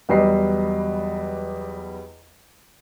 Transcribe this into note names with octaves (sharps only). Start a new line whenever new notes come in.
E2 F#3 G3 B4 D#5 C7